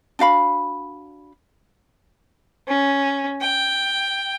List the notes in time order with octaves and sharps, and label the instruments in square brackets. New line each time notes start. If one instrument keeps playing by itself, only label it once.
[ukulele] D4 F#4 F5 B5
[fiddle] C#4
G5